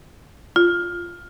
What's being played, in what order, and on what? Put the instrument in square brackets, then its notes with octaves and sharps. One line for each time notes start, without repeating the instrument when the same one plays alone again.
[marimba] F4